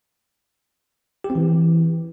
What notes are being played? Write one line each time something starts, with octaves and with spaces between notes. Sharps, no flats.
G4
C4
E3